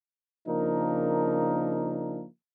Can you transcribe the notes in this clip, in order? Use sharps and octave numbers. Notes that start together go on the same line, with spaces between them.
C#3 F3 A#3 D4 D#4 A#4